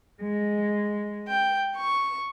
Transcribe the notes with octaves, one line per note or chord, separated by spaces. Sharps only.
G#3
G5
C#6